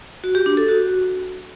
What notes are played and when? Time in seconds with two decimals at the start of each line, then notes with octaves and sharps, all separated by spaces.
0.24 F#4
0.35 G4
0.46 D4
0.57 A4
0.68 F#4